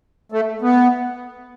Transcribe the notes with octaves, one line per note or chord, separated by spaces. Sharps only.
A3
B3